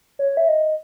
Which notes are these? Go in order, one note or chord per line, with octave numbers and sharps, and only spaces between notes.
C#5
E5
D#5